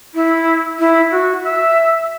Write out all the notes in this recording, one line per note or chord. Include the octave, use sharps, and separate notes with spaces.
E4
E4
F#4
E5